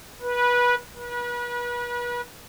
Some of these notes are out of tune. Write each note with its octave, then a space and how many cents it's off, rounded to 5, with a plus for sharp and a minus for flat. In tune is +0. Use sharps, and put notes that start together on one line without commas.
B4 -20
B4 -35